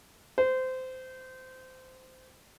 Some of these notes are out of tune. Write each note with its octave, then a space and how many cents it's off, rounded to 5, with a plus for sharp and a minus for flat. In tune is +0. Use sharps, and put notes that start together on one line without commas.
C5 -20